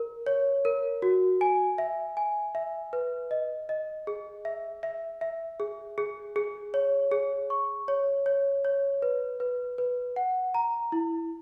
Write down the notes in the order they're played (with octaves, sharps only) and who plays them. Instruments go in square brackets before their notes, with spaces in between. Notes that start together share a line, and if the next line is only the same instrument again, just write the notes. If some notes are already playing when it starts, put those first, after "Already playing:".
Already playing: [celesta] A#4
C#5
A#4
F#4
G#5
E5
G#5
E5
B4
D#5
D#5
G#4
E5
E5
E5
G#4
G#4
G#4
C#5
G#4
C#6
C#5
C#5
C#5
B4
B4
B4
F#5
A#5
E4